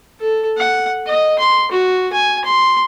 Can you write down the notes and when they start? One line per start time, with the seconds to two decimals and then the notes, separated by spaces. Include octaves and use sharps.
0.20 A4
0.58 F#5
1.07 D#5
1.39 C6
1.72 F#4
2.13 G#5
2.45 C6